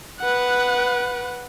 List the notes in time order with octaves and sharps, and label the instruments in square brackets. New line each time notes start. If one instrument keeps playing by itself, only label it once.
[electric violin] B4 F#5